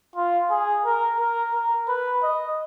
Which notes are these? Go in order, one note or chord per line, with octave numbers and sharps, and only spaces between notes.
F4
G#4
A#4
A#4
A#4
B4
D#5